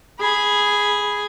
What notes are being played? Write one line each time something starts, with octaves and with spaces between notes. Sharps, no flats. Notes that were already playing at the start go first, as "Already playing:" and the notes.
G#4 B5